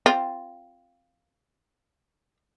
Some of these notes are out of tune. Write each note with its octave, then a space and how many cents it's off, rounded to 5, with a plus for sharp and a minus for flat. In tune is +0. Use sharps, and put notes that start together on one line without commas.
C4 +0 F4 +0